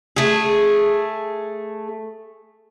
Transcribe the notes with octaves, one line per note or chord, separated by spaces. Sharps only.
A3 G#4